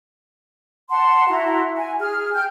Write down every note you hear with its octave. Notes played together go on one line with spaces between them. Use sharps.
F#5 A5 C6
E4 F#4 A#5
G#5
G#4 F6
G5 F6 G6